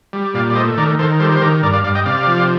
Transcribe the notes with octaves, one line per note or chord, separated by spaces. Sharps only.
G3
A#2 D5 F5
D5
A3 C5 D#5
D#3 A#4 D5
D#3 A4 C5
G3 A4 C5
C5
D#3 G4 A#4
G2 A#4 D5
D5 F5
G2 D5 F5
D#5 G5
C3 D5 F5
F3